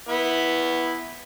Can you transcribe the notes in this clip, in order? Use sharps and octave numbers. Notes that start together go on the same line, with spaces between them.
B3 E4